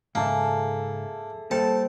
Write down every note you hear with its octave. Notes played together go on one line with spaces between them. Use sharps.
G#2 C#3 A#3 G#4 A4 E5
G3 A#3 A4 C5 G5 A5